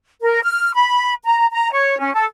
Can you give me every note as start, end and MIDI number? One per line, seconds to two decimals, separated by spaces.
0.23 0.42 70
0.43 0.71 89
0.74 1.14 83
1.24 1.45 82
1.51 1.71 82
1.72 1.98 73
1.99 2.12 61
2.14 2.24 69